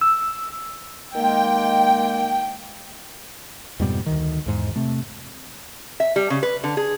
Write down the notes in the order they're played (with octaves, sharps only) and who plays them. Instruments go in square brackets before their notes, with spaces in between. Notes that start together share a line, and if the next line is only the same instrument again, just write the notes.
[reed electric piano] E6
[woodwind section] D#3 G#3 A#3 [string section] G5
[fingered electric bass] F2 G#2 B2 G3
D2 D#3
E2 G#2
C3 A3
[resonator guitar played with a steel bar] E5
G3
C#3
B4
D3
G#4